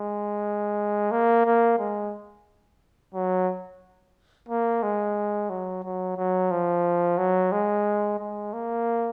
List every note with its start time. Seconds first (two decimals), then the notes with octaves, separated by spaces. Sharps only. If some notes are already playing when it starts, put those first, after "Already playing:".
Already playing: G#3
1.11 A#3
1.45 A#3
1.78 G#3
3.14 F#3
4.49 A#3
4.83 G#3
5.49 F#3
5.83 F#3
6.17 F#3
6.51 F3
7.18 F#3
7.52 G#3
8.19 G#3
8.53 A#3